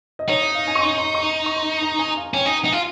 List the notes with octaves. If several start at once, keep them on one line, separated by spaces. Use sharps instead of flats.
D#5
D#4 C#5
D#5
F5
G#5
C#6
C6
C6
C#6
C#6
C6
A#5
G#5
F5
C#4 G5
G#5
D#4 G5
G#5
D#4
F4